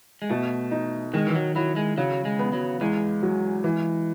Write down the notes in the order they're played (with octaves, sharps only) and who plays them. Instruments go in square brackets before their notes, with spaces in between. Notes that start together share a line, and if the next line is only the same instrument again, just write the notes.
[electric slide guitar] G#3
[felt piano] B2 [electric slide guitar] A3
[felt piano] D#4
[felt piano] D#3 [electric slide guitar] G#3
[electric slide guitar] E3
F#3
[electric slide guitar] F#3 [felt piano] E4
[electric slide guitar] G#3
[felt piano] C#3 [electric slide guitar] F#3
[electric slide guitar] G#3
[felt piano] B3
[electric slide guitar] F#3
[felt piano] E2 [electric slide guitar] G#3
[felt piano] F#3
E3